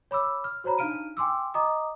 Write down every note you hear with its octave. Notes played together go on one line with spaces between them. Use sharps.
C#5 B5 D6 E6
F6
F#4 C5 C#5 A#5 B5
D4 D#4 F5 F6 D7 D#7
G5 G#5 C6 D6 E6
D#5 A#5 D6 D#6